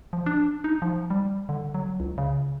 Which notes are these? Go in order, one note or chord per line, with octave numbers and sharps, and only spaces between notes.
F3
D4
D#4
F3
G3
D3
F#3
C#2
C#3